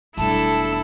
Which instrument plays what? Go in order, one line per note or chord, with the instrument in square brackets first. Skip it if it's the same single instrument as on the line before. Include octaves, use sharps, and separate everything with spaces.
[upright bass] E1 G3 [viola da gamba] A3 D4 A4 [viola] E4 [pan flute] A5